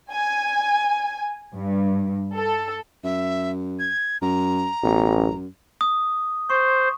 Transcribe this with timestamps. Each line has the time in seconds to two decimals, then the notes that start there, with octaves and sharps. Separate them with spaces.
0.11 G#5
1.53 G2
2.35 A4
3.04 F#2 E5
3.79 G#6
4.22 F#2 A#5
4.83 A1 B2
5.16 F#2
5.81 D#6
6.50 C5 C#6